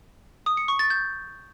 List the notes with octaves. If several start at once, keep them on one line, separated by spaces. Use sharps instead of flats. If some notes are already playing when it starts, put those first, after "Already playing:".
D#6
C#7
C#6
A6
G6